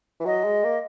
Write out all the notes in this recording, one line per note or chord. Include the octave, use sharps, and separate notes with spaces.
E3
F#3 D#5
G#3
A#3